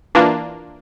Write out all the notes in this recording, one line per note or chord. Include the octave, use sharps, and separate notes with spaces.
E3 A#3 D4 F4